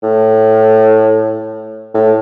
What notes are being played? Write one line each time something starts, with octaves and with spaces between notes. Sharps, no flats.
A2
A2